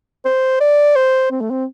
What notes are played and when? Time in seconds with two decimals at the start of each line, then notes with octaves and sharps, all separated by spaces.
0.25 C5
0.60 D5
0.96 C5
1.31 C4
1.41 A3
1.50 C4